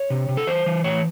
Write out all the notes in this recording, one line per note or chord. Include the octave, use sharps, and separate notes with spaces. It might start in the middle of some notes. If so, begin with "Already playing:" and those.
Already playing: C#5
C3
C3
A4
E3 C5
E3
A2 C#5